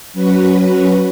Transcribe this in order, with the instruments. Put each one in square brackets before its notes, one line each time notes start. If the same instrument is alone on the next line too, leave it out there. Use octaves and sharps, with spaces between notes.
[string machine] F#3 C#4 F#4 B4